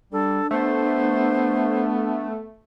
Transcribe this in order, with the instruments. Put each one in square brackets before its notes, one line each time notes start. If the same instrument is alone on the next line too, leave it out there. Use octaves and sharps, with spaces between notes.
[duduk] G3 [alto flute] D4 [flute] A4
[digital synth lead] A3 [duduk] B3 [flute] C5